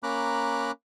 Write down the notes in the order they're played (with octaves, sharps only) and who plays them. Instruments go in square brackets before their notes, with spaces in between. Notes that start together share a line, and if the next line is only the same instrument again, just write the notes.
[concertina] A#3 C#4 A#5 B5 D6 F#6